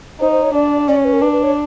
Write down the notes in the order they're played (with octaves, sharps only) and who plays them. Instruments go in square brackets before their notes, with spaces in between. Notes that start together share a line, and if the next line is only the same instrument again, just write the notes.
[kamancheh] D#4 [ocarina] C5
[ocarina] C5
C#5
[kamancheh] D4 [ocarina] D5
[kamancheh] C#4 [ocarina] D5
[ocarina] C#5
B4
A#4
[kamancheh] D4 [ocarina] B4
[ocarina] B4
C#5